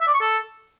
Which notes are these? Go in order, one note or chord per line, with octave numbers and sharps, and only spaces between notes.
E5
D5
C#6
A4